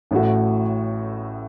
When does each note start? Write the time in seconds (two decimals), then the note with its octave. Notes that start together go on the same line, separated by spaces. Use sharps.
0.11 A1 A2 A3 F#4